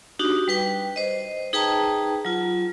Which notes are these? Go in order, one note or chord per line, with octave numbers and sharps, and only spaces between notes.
D4 D#4 F#4 G4
G3 B4 G5
C5 D#5
D#4 G#4 B4 G5 A5 A#5
F#3 F4